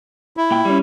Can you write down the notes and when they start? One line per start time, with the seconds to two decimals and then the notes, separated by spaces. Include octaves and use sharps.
0.37 E4
0.51 A#2 G5
0.65 G3 C#4